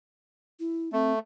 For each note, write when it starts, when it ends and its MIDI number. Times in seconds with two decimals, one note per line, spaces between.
0.60 0.92 64
0.93 1.19 57
0.93 1.12 60